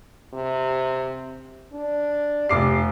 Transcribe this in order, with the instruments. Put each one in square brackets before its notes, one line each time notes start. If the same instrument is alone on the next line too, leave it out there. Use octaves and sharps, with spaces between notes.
[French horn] C3
D4
[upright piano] F1 D6 C7 [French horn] G4